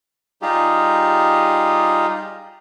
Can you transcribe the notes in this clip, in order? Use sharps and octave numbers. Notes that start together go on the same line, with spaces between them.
G3 D#4 F4 G4 G#4